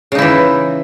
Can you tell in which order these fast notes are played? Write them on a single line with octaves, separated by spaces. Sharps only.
C#3 D#4 E4 E3